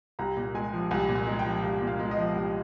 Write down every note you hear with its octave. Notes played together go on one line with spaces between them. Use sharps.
C2 A#5
A#2
G#3 G#5
F3
C2 G#5
A#2
G#5
G#3
G5
F3
C2 F5
A#2
F5
G#3
D#5
F3
C2